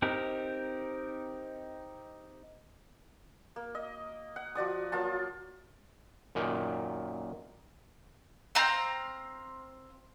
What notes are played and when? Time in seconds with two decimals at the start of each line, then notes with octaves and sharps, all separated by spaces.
0.02 C4 D#4 G4 A#4
3.56 A#3
3.75 D#5
4.36 F#5
4.55 F3 F#4 D5 D#6
4.92 F#3 A#3 F4 A5
6.35 F#2 A#2 D#3
8.55 C4 F5 A#5 G6